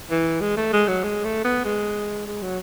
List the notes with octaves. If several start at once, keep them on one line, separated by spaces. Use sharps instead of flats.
E3
G#3
A3
G#3
F#3
G#3
A3
B3
G#3
G#3
F#3